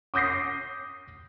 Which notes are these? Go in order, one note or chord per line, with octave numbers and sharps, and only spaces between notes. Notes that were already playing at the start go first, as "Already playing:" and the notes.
D6 D#6 G6 A#6 C7